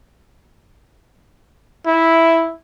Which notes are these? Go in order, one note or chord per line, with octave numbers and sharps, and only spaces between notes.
E4